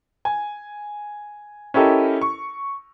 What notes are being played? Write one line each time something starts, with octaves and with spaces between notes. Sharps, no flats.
G#5
C#4 E4 G4 A4 A#4 D#5
C#6